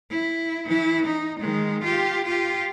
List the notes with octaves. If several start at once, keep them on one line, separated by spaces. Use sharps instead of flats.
E4
E3 E4
D#4
D#3 G#3
F4 G4
F4 G4